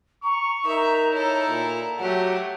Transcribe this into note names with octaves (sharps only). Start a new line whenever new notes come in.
A#5 C#6
D#4 A#4 E5
E4 A4 C#5
A#2
F#3 A3 G4 F#5